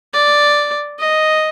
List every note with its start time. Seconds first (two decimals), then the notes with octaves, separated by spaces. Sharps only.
0.14 D5
0.99 D#5